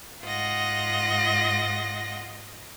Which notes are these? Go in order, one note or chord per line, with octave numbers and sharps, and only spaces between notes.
G#2 F4 D#5 F#5 A#6